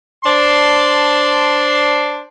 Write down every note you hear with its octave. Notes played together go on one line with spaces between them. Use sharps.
D4 C5 D5 A5 C6